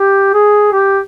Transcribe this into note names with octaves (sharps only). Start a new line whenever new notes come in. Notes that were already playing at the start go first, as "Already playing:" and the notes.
Already playing: G4
G#4
G4